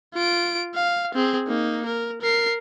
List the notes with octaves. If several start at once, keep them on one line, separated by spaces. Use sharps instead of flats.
F4 D7
F5
C4 G#4
A#3 D#4
A#4
A#4 C7